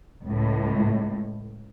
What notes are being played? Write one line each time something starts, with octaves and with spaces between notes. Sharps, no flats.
C#2 A2